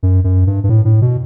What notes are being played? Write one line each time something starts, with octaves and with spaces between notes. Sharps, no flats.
F#2
F#2
G2
G2
A2
A2
B2